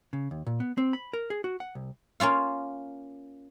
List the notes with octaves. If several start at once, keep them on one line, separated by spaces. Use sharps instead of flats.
C#3
D#2
A#2
B3
C4
B5
A#4
G#4
F#4
F#5
C2
A#3 C#4 F4 F5